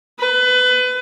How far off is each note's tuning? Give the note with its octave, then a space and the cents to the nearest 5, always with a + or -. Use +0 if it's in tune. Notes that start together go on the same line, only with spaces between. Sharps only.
B4 +25